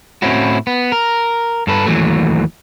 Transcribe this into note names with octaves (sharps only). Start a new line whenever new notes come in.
A2 C4 C#4 E4 F#4
B3
A#4
G2 A4 B4
D#2 E3 F#3 A3